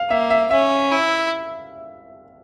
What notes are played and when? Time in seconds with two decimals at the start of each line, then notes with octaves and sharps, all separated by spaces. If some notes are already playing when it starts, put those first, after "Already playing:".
Already playing: F5
0.10 A#3 E5
0.30 E5
0.51 C#4 E5
0.91 E4